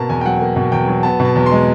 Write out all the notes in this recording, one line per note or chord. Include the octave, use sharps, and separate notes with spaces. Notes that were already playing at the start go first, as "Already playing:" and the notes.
Already playing: B2 A#3 A5 A#5
E2 G#5
G5
F#3 F#5
A#3
B2
E2 G5
F#3
B3 A5
B2
A5
E2
C6
G#3